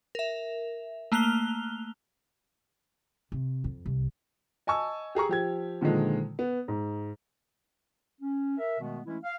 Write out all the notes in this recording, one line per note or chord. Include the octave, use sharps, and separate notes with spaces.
A#4 E5
A3 A#3 F6 F#6 F7 G7
C3
F2
C2
D#5 G#5 A5 C#6 E6
G4 G#4 A#5 C#6
F3 G4 G#6
A#2 D3 D#3 F3 G#3
B3
G#2
C#4
A#4 E5
B2 D#3 G#3 A3 B3
E3 G#3 A3 C#4 E4
F5